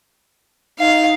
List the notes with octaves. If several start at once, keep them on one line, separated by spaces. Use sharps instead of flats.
D#4 F5